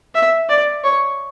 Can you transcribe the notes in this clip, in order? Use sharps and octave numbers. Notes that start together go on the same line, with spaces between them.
E5
D5
C#5